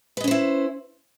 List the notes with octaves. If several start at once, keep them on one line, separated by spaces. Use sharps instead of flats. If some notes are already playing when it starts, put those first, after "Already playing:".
C#4 E4 B4 C5 D#5